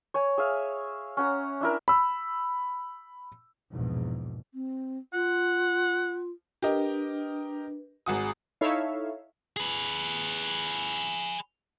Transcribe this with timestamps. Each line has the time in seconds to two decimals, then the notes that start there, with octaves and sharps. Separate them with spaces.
0.14 C#5 G#5
0.38 G#4 E5 F5
1.17 C#4 F#5 A#5
1.61 D4 E4 A#4
1.88 B5 E6
3.72 A#1 E2 G#2 B2
4.54 C4
5.13 F4 F#5
6.62 D4 G4 A#4 B4 D#5
8.06 G#1 F#4 G#4 G#5 D#6
8.61 D#4 E4 A4 C#5 E5 F5
9.56 G#4 B4